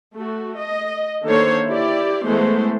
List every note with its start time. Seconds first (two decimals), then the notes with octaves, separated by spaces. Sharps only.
0.14 A3 F#4
0.57 D#5
1.23 D3 D#3 A#3 A4 C5 C#5
1.69 E4 G4 D5
2.26 E3 G#3 A3 B3 C5